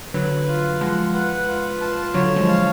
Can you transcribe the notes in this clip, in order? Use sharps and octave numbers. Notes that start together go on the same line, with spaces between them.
D3 F#3 B4
F4
F3 G#3 F#5
B4
F4
A5
D3 F#3 C#5
F3 G#3
F5